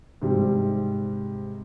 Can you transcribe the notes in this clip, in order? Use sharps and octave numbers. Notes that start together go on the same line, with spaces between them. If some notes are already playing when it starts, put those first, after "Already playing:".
G#2 C3 G3